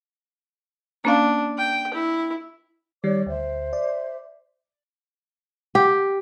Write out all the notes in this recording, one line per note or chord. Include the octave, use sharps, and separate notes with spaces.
A#3 C#4 D4 F5
G5
E4
D#3 G3 C#5 D5 D6
D2 C5 E5
D5
G4